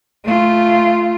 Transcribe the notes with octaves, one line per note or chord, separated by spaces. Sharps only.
A3 F4